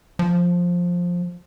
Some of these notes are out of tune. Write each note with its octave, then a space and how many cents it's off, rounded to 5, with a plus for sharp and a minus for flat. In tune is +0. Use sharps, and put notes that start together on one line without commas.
F3 +10